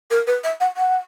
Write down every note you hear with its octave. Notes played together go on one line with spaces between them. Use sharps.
A#4
B4
E5
F#5
F#5